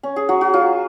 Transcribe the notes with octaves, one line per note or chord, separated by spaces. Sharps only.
C#4
G#4
F#3 F#4
F#4
F#3 F4